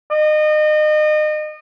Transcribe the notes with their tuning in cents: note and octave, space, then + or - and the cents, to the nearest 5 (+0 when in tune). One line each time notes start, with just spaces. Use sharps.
D#5 -30